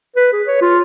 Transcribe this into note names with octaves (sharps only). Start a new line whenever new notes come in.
B4
G#4
C#5
F4